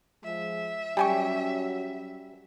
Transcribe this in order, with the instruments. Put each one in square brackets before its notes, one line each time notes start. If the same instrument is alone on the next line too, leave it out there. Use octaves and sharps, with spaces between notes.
[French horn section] F3 G#3 [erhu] E5
[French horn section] F#3 C#4 [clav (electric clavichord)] G3 [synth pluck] G5 G#5 C#6